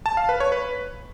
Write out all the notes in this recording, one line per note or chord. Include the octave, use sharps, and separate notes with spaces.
A5
F5
B4
C#5
B4